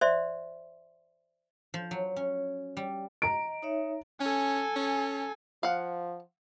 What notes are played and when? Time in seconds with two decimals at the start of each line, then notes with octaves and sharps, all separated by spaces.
0.01 C5 D5 E5 C6
1.74 F3
1.91 F#3
2.16 C#4
2.77 G3
3.22 D#5 A#5 D7
3.62 D#4 C#5 E5
4.21 C#4 A4 G#5
4.76 C#4
5.63 F3 F5 F#5